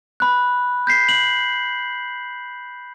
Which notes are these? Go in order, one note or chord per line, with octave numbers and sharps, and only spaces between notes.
B5 F#6
G6 B6 C7
F#7